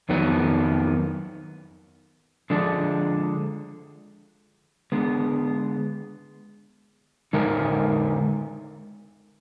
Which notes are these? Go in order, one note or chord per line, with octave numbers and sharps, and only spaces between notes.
F2 D#3 F#3 B3
D3 F3 G#3 D4
D3 G#3 B3
D3 G#3 D#4 A#4